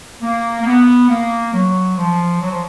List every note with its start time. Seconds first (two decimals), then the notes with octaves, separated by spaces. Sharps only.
0.22 A#3
0.61 A#3
0.66 B3
1.09 A#3
1.54 F#3
1.97 F3
2.41 F#3
2.51 F3